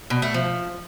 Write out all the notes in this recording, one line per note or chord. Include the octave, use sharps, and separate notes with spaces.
B2
A3
F3